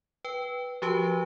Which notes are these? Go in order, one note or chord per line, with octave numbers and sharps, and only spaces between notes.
B4 G5
F3 F#4 G4 B4 A5 D7